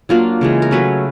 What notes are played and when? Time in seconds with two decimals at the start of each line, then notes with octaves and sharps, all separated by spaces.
0.09 F#3 A#3 D4 F4
0.41 C#3 E3 G#3
0.62 A#4
0.71 F#3 A3 C#4 B4